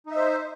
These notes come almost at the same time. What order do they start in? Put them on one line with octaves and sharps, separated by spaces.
D#4 E5 C5